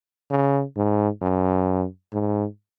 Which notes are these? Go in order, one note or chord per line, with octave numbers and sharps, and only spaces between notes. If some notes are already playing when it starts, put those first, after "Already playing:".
C#3
G#2
F#2
G#2